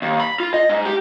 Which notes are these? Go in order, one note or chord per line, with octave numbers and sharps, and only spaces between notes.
D#2
B5
F4
D#5
G#2
G4